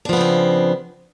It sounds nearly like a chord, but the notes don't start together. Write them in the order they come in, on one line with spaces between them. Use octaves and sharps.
D4 F3 B3 C#3 C4